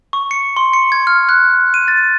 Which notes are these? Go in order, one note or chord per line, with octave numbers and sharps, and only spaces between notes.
C#6
C#7
C6
C#7
G#6
F6
F#6
D#7
A6